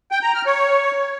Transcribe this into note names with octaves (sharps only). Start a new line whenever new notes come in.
G5
A#5
F6
C#5